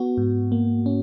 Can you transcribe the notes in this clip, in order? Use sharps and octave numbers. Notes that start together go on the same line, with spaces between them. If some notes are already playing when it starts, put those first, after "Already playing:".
Already playing: B3 F#4
G#2
A#3
C#4